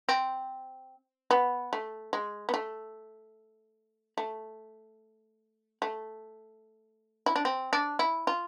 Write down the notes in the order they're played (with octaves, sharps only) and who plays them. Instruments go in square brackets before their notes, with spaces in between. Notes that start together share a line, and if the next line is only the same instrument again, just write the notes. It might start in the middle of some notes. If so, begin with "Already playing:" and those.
[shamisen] C4
B3
A3
G#3
B3
A3
A3
A3
E4
D4
C4
D4
E4
F4